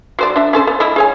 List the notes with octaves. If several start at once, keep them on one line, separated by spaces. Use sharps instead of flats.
F#3 C5 D5
D4 E5
C#4 A4 C5
B3
A3 E4 D#5
G#4 C#5 G#5